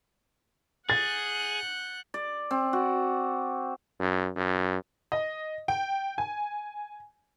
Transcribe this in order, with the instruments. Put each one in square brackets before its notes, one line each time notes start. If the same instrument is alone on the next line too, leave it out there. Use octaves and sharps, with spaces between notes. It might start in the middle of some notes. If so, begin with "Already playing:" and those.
[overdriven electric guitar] G#4 [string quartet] F#5 F#6 G6 [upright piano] A6
[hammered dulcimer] D5
C4
F#4
[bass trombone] F#2
F#2
[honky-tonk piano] D#5
G5
G#5